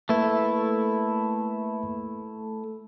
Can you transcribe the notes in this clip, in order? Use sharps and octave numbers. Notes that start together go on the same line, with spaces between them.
A3 A#3 E4 B4 E5